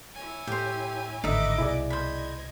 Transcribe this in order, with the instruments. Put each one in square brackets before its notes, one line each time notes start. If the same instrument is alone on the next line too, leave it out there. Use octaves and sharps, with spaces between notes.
[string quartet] E4 C#5 G#5
[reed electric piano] A2 [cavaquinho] G4 C5
[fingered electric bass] G#1 [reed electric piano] A2 D3 [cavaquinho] D#4 E5 [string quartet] B4 D#5 D6
[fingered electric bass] C2 B2 [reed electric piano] E4 G#4 D5
[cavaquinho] C5 B5 [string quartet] D#5 G#6